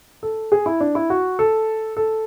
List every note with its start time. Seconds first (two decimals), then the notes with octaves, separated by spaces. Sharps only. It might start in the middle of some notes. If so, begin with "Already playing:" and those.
0.23 A4
0.52 G#4
0.66 E4
0.80 D4
0.95 E4
1.10 F#4
1.39 A4
1.97 A4